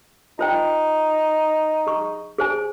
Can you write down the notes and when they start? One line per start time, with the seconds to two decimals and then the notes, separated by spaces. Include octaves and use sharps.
0.39 D#4 F4 C5 G5
1.87 G#4 C#6
2.38 G#4 C5 G#5